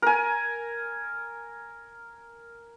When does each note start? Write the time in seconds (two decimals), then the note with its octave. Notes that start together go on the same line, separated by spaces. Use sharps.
0.02 A#4 G#5